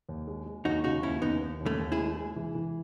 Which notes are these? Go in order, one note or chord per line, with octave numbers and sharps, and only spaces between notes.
D#2
G#3
G#3
D#2 D#4 F#4
C#3 D#4 F#4
D#2 C#4 E4
D#2 B3 D#4
D#2
D#2
A3 C#4
D#2
E4 G#4
G#3
G#3
E3
E3